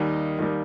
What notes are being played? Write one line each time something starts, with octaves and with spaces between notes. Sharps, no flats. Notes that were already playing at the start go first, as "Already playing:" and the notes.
Already playing: D#2 D#3 G3 A#3 D#4
D#2 D#3 G3 A#3